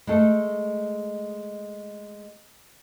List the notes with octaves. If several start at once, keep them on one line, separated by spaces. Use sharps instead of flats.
G#3 A3 A4